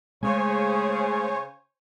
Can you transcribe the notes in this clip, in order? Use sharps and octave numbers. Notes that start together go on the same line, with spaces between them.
C#3 G#3 A3 C#4 C5 C#5 G#5